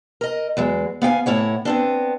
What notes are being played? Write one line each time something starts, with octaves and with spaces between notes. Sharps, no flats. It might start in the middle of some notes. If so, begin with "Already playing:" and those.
A#4 D#5
E2 F#3 G#3
B3 F5 G5 G#5
A2 E4 C#5 F#5
B3 C4 D4